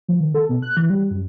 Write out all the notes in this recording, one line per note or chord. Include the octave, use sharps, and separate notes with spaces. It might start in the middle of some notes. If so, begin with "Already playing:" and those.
F3
D#3
A4
B2
F#6
E3
G3
F#2